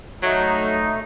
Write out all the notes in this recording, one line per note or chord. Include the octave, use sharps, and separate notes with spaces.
F#3 A3 D#4